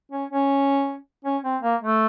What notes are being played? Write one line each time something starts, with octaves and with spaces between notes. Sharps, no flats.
C#4
C#4
C#4
C4
A#3
A3